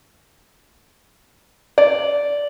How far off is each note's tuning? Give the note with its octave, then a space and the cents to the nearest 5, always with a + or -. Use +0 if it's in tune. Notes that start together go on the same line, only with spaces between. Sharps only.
D5 -15